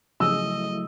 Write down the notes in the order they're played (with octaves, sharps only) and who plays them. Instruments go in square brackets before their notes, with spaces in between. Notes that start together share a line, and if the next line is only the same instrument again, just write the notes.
[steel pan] C#3 F3 G#4 [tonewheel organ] F#3 A3 E4 [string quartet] D#5 [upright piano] E6